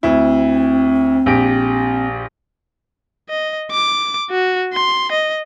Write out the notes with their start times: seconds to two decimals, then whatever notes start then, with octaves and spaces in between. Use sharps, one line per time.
0.03 D2 C4 E4
1.26 A#1 G4 D7
3.30 D#5
3.71 D6
4.30 F#4
4.73 C6
5.12 D#5